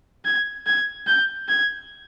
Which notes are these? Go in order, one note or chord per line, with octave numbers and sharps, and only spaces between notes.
G#6
G#6
G6
G#6